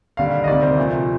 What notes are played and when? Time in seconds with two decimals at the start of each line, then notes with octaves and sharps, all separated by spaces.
0.17 D#2 D3 G3 F5
0.44 D#5
0.48 D2 C3 D#3 G3 D5
0.63 C5
0.77 C2 A#2 F3 A3